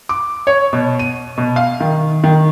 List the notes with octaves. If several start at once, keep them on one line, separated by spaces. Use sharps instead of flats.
D6
C#5
B2
D#7
B2
F5
D#3
D#3